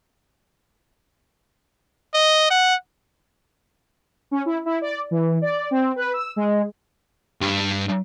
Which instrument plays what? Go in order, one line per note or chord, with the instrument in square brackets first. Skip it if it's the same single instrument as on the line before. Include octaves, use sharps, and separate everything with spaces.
[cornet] D#5
F#5
[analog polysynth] C#4
E4
E4
D5
E3
D5
C4
B4
E6
G#3
[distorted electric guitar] G2